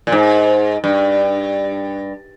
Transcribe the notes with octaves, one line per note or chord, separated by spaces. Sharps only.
A#2
G#2
G2